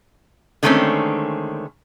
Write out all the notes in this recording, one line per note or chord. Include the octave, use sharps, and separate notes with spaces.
D3 D#3 G#3 A3 C4 C#4